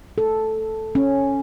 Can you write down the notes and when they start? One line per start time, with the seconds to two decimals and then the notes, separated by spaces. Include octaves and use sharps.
0.18 A4
0.95 C#4